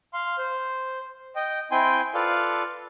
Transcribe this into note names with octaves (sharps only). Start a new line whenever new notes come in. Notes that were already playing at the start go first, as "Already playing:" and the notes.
F5 C6
C5
D#5 G5
C4 E4 G5 G#5 C6
F4 A4 B4 D5 F5